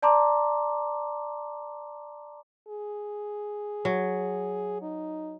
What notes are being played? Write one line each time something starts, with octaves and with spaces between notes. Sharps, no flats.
D5 A5 A#5 C6 D6
G#4
F#3
D#4